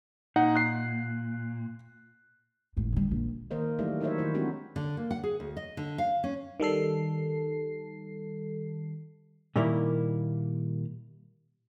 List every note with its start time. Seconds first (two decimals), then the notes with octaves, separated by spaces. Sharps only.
0.36 A#2 D#4 F#5
0.56 F#6 C7
2.77 G#1 A2
2.92 D3 G3
3.11 A#1
3.51 D#3 A#3 A#4 C5 D#5
3.79 E3 F#3 G3 A3 D#4
4.01 F#3 D#4 E4 C5 C#5 E5
4.18 D#3 E4 C5
4.34 G#3 C4 D4 E4 F#4 G4
4.76 D3
4.97 A#3
5.11 F#5
5.24 G#4
5.40 D2
5.57 D#5
5.77 D3
5.98 F5
6.24 C#4
6.60 D#3 G3 A4 C7
9.56 A#2 D#3 G3 A#3 E4